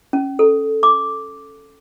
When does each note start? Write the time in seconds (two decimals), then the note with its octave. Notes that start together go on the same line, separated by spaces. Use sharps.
0.13 C#4
0.39 A4
0.83 D6